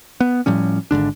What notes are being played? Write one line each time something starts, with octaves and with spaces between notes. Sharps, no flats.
B3
A2 F3 G3 C#4
G#1 G#2 D3 D4